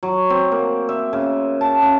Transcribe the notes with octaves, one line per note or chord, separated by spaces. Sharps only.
F#3
C4
A#3
E5
C#3
A5
C#3